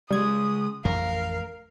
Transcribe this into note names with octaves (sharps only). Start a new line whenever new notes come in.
C#3 G3 G#3 D#6 G#6
A1 F2 A3 A#4 F5